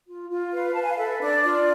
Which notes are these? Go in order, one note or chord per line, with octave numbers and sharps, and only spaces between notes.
F4
F4
B4 F5
B4 A5
G#5
F5
A4 E5
D4 D5
F4 D5